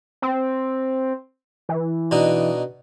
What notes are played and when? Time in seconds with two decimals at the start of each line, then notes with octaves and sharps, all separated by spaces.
0.22 C4
1.69 E3
2.11 B2 D4 D#4